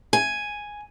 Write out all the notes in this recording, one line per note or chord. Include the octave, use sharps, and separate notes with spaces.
G#5